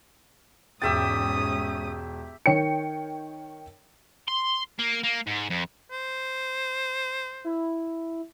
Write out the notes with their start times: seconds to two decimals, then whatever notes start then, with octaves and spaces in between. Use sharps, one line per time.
0.82 E1 G#2 C#4 G4 E5 G5 D#6 A6
2.46 D#3 C#5 G5 C#7
4.28 C6
4.79 A#3
5.04 A#3
5.27 G#2
5.50 F2
5.91 C5
7.44 E4